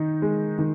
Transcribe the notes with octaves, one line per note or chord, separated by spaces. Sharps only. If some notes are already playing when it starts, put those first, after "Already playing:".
Already playing: D#3 D#4
G#3
D#3